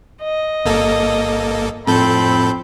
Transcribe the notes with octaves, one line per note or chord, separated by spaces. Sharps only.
D#5
G1 A#3 A4
F2 A2 C4 A4 B5 G6